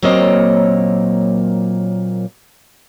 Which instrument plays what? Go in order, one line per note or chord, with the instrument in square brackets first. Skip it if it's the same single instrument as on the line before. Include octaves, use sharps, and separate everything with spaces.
[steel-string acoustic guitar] A#2 F#3 A#3 C4 C#5 D#5